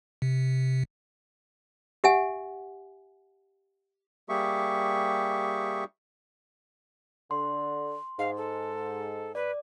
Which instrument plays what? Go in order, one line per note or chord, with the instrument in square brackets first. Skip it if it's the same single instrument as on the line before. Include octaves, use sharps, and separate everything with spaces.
[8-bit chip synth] C3
[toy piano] G4 E5 F#5 G#5
[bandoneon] G3 A#3 G4 G#4 E5 C#6
[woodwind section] D3 [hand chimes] C6
[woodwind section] G#2 [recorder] F5
[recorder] A4
[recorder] B4 [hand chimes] D5